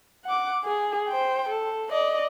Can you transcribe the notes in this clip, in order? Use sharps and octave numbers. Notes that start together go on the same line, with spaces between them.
F#5 D6
G#4
C5 G5
A4
D5 D#5